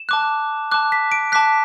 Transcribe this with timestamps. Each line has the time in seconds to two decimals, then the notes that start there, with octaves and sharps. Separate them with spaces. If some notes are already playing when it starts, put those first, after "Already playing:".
Already playing: E7
0.09 A5 D6 F#6
0.71 A5 D6 F#6
0.92 B6
1.12 D7
1.32 A5 D6 F#6 B6